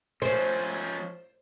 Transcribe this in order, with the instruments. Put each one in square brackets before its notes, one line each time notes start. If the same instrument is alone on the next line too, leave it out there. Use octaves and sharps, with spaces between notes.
[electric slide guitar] F3 C#4 [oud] C5